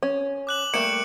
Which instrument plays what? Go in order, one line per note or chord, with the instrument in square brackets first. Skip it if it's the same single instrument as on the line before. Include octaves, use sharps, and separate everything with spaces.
[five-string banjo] C#4
[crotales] D6 F#6 F#7
[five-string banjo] G3 A3 A#3 [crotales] C#7 D7 E7